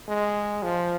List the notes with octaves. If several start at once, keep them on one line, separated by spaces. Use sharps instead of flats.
G#3
F3